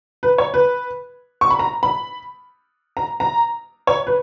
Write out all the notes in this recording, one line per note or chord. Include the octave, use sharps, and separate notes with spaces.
B4
C#5
B4
C#6
B5
A#5
B5
A#5
A#5
C#5
B4